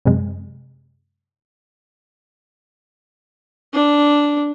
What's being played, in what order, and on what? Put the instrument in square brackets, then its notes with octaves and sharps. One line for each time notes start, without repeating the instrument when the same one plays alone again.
[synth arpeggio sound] F#2 C3 G#3
[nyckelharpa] D4